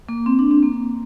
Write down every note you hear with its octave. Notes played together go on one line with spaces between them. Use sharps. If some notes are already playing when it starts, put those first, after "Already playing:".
A#3
C4
D4
C4
A#3